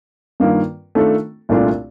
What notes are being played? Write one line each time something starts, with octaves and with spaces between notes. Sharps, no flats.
G2 D#3 A#3 F4
D#3 A3 D4 F4 A4
C2 A#2 A3 D4 F4